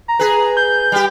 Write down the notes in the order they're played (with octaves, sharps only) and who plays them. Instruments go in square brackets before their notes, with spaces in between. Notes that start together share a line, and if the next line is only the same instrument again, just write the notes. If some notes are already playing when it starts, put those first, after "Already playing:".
[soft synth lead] A#5
[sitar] G#4 B4
[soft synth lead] G6
[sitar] G3 G4